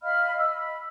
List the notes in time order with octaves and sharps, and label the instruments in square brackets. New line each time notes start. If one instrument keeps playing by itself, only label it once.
[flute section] D#5 F5 B5 F6
D#5 E6
B5